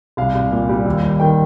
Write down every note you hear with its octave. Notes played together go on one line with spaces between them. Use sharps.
C2 F5
C2
A#2
G3
D#2
D#2
D#3 G5